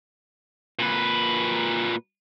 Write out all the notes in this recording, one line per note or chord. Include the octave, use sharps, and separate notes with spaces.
A#2 B4